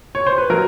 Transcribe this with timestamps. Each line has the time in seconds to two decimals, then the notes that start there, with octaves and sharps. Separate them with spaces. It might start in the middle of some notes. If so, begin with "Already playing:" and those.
0.15 C#5
0.26 C5
0.38 B4
0.50 F#3 A#4